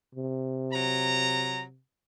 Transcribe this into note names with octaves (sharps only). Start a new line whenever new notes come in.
C3
F#3 A#5